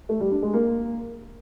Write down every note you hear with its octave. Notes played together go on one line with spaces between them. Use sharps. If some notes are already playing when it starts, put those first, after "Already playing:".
A3
G3
D4
G#3
A#3